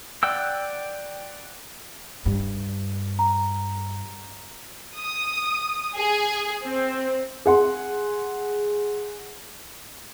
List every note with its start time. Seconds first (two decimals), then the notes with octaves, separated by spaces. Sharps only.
0.23 D5 F#5 G5 E6
2.26 G2
3.19 A#5
4.97 D#6
5.96 G#4
6.63 C4
7.46 G#4 F#5 C6